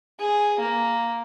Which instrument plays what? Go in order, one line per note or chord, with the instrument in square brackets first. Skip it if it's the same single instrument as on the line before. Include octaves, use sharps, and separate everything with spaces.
[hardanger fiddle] G#4
A#3